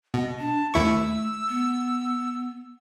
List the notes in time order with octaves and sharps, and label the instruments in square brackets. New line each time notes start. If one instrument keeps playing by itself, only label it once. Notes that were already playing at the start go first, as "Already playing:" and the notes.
[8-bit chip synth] B2 [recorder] D#5
[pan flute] D4 [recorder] A5
[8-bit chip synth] D#2 E4 C#6 [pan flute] A3 [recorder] E6
[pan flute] B3